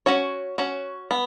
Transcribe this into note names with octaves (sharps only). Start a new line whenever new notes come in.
C#4 F#4 C#5
C#4 F#4 C#5
B3